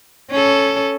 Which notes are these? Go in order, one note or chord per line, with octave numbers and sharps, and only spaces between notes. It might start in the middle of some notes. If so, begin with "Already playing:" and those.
C#4 A4